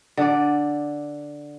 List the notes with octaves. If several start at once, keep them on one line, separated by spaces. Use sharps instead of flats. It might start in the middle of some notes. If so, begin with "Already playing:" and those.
D3 D5